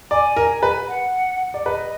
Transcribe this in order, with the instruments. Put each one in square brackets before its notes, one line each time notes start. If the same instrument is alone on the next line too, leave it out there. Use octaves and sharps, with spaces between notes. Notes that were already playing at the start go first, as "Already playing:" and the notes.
[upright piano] D5 [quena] G#5
[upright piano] A#4
B4
[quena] F#5
[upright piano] D5
[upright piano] B4 [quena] D#5